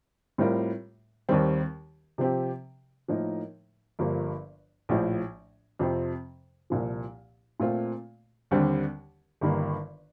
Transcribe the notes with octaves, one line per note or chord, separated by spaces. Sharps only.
A2 G3 C4 F4 A#4
D#2 D#3 G3 C4
C3 F3 C4 G4
A2 F3 A#3 D#4 A#4
G1 G2 F3 A#3
A#1 A2 F3
F2 C3 F3 C4
C2 A#2 F3
A#2 A3 C4 F4
D#2 D3 G3 C4
G1 G2 D#3 A#3